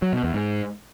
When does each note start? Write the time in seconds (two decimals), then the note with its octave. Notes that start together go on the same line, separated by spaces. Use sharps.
0.02 F#3
0.13 B2
0.23 E2
0.34 G#2